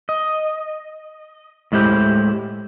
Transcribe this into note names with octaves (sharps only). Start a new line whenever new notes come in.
D#5
A2 G#3 E4 G4 C5